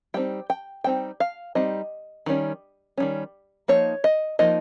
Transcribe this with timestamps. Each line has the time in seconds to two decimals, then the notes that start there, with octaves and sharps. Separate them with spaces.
0.14 G3 C4 D#4 G5
0.50 G5
0.84 G3 C4 D#4 G5
1.20 F5
1.55 G3 C4 D#4 D#5
2.26 D#3 G3 C#4
2.98 D#3 G3 C#4
3.68 F3 A#3 D#4 C#5
4.04 D#5
4.39 F3 A#3 D#4 D#5